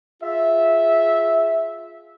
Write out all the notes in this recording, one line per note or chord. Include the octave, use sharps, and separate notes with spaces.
F4 G#4 E5